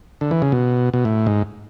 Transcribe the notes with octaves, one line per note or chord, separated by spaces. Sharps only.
D3
E3
C#3
B2
B2
A2
G#2